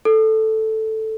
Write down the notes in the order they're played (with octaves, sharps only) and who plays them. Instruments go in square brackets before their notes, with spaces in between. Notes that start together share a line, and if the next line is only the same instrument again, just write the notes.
[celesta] A4